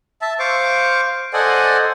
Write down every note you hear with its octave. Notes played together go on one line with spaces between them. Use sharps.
E5 A5
C5 F5 C#6 D6
A4 C5 D5 D#5 F#5 G#5